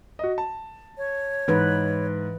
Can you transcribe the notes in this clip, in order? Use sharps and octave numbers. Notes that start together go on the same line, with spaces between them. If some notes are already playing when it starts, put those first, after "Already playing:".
F#4 D#5
A5
C#5
G#2 E3 B4